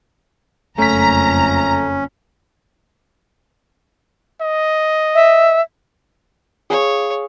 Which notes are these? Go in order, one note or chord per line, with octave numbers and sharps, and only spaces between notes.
F#1 F2 A3 C#4 A#5 B6
D#5
E5
G#4 C#5 F5